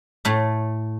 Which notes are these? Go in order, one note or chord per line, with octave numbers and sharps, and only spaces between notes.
A2 A3